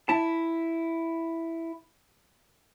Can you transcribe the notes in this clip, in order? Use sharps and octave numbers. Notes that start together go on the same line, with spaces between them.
E4 A5